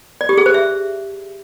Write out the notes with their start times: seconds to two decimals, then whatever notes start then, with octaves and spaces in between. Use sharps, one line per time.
0.21 D5
0.29 G4
0.37 G#4
0.46 C5
0.54 E5